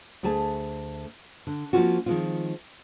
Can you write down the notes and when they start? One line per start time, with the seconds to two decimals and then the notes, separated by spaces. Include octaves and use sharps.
0.23 D2 A3 G#4 G#5 A5
1.47 D3
1.73 F3 A#3 C4 C#4 F4 F#4
2.06 D#3 F3 G3 G#3 C4 F4